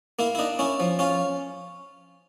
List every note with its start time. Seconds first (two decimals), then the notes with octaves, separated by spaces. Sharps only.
0.19 A#3 E4
0.35 E4
0.39 D4 D#4
0.59 C#4 E4
0.80 F3
0.99 C#4 F4